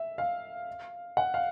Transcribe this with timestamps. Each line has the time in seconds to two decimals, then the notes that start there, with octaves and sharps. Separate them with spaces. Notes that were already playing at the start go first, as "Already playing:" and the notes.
Already playing: E5
0.18 F5
1.17 F#5
1.34 F5